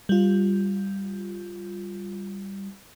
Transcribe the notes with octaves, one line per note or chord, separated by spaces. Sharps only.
G3 F4